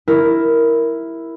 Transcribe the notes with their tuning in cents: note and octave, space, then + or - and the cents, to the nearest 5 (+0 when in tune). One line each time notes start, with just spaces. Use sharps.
E4 +0 G4 +0 A#4 +0